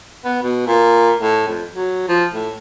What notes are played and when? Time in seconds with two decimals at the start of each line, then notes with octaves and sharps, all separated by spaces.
0.25 B3
0.43 B2
0.67 A#2
1.19 A2
1.47 F2
1.74 F#3
2.08 F3
2.33 A2